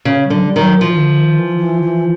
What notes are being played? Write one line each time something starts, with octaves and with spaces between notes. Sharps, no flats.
C#3
G3
D3 F#3
G3
D#3
F#3
E3 F3
D#3
D3
D#3
E3
E3
E3